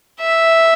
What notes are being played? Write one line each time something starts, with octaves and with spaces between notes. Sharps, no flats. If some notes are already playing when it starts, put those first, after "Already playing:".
E5